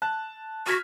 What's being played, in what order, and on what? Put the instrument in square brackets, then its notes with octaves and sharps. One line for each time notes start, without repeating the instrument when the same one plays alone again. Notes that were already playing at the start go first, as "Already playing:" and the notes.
[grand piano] A5 F#6
[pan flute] F#4 [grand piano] F6 G#6 B6